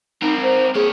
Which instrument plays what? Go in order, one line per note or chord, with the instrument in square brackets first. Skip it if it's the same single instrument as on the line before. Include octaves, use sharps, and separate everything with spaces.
[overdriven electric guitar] C4 A#4 [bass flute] D#4
[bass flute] C5
[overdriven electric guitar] A#3 C#5 [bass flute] G#4